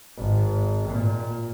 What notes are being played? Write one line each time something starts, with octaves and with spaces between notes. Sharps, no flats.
G#1
A#2